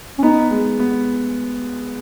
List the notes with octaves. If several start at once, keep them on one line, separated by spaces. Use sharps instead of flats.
C#4
B3 D#4
G#3
B3